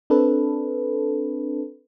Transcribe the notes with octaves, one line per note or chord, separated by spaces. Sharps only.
C4 D4 A4 B4